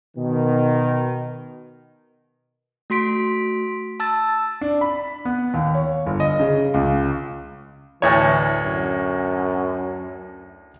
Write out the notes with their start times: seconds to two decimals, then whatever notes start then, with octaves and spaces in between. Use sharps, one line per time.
0.17 B2 D#3
2.90 A3 F#4 C6 B6 D7
4.00 A5 E6 A6
4.61 D4
4.81 B5
5.25 B3
5.54 D#2
5.75 C#5
6.06 G1
6.20 D#5
6.40 C#3
6.74 C#2
8.02 D2 A2 E3 C#5
8.62 F#2